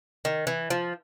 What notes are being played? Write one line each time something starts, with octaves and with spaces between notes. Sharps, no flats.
D#3
E3
F3